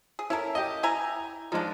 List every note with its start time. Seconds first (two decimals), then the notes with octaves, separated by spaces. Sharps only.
0.19 G#4
0.30 C#4 E4 A4 A#4
0.55 G4 D#5
0.83 E4 G#5 A#5
1.52 F3 G#3 D4 D#4